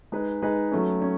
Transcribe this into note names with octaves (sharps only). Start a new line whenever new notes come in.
G#3 D#4 G#4 B4
G#3 D#4 G#4 B4
F#3 A3 C#4
C#4